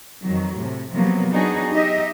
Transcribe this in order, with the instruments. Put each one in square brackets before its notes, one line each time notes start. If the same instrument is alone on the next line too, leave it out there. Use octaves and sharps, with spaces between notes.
[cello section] F2 D#3 F#3
A2 C3
C3 F3 F#3 A#3 B3
F#3 B3 D4 D#4 F#4 G#4
D#4 G4 D#5 E5